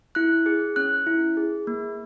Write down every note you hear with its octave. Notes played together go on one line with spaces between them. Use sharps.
E4 F#6
G#4
C#4 F#6
E4
G#4
A#3